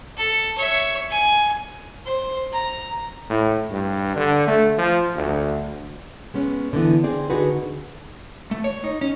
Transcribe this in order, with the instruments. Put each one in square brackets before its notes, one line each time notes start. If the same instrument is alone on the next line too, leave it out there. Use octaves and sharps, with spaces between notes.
[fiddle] A4
C#5 E5
G#5
[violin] C5
A#5
[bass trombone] A2
G2
D3
A3
F3
D2
[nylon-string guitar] G#3 B3 C#4
D3 E3 B3
C4 G#4 D5
D3 D#4 F#4 G#4 B4
[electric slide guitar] A3
C#5
D#4
C#4